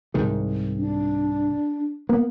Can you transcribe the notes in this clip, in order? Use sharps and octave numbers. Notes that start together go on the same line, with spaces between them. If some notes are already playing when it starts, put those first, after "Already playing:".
C2 G#2 D#3
D4
A#3 B3